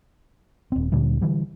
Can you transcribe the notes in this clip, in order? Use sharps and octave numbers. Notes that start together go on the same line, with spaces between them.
D#1 C4
D2 A#2 D3 G3
D3 E3 G3